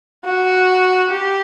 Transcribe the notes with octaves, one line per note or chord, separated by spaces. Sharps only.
F#4
G4